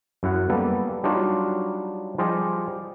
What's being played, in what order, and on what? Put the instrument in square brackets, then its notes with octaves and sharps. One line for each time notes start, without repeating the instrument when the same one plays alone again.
[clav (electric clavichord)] F#2 E4 F#5
G3 A#3 B3 A4
F#3 G3 D4 D#4 F4 F#4
F3 G3 F4 G4 G#4 D#5